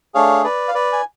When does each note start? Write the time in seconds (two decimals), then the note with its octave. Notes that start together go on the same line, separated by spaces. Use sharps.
0.14 A3 D4 G#4 C#5 F5
0.44 B4 D5
0.68 F5
0.74 B4 D5
0.93 G#5